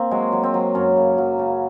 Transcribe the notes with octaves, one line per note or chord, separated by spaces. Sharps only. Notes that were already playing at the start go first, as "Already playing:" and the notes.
Already playing: A#3 C4
F#3 G#3
F#3
C4
F#3
F#2 C#4
C#3
F#3
C#3